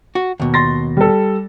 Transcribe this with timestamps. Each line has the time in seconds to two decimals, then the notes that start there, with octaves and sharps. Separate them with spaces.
0.15 F#4
0.40 D#2 B2
0.54 C6 A6 A#6
0.97 G3 A4